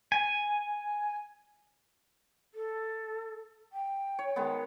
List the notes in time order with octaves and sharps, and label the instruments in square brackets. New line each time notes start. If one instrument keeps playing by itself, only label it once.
[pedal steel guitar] G#5
[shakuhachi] A4
G5
[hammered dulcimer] C#5
D#3 G#3 B3